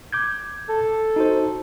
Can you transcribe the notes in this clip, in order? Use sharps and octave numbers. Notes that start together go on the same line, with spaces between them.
D6 G6 G#6
A4
D#4 F#4 C5